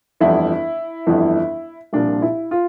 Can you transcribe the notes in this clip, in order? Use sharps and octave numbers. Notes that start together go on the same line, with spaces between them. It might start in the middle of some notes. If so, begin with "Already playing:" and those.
G1 F2 E3 E4
G1 F2 E3
C2 A#2 F3 D4
E4
F4